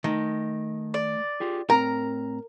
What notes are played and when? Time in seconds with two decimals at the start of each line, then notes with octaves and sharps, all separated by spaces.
0.04 D#3 A3 D#5
0.94 D5
1.40 F4 G4 G#4
1.70 A2 C4 A#4 A#5